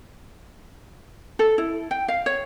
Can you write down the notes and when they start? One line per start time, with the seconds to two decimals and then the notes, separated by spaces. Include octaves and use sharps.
1.39 A4
1.58 E4
1.91 G5
2.08 F5
2.26 C#5